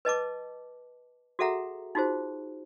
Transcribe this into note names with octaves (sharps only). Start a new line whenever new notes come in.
B4 D#5 A5 D6
F#4 G#4 A4 E5 F#5 A#5
D#4 F4 F#4 G#4 C5